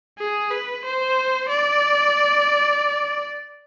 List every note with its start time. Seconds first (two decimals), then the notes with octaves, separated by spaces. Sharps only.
0.18 G#4
0.51 B4
0.85 C5
1.49 D5